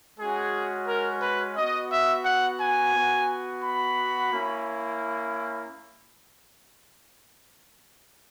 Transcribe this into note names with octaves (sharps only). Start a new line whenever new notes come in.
G#3 C#4 F#4 G#4
A#4
B4
B3 F#4 D#5
E5
F#5
G#5
B3 F#4
B5
A#3 C#4 E4